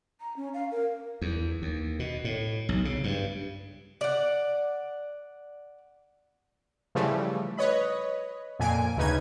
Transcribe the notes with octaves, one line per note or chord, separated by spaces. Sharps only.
A#5
C#4
F5
A#4
E2
D#2
B2
A2
B1
C#3
G2
D5 F#5
C#3 E3 F3 G3 A3
B4 C#5 D#5 B5
F2 A#2 G#5 D7
D2 C#3 D#4 B4 G#6 D#7